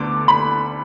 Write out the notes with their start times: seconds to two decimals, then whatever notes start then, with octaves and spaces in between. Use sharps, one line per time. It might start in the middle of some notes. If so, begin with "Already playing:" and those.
Already playing: D2 D3 B3 D4 D6
0.28 B5